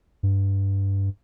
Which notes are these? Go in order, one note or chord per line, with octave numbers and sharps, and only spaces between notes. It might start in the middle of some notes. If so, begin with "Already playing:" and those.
G2